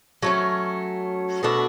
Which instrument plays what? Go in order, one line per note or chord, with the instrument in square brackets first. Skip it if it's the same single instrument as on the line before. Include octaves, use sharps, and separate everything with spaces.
[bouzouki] F#3 A3 C#4
B2 A3 D4 F#4